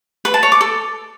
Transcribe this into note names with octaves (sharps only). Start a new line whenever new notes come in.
B4
A5
C#5
D6
A4